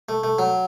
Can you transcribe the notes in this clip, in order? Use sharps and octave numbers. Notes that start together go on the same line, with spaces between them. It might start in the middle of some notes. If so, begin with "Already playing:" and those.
A3
A3
F#3